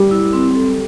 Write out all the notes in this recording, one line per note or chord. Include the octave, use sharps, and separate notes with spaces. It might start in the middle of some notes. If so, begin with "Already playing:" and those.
Already playing: G3
E4
C4
A4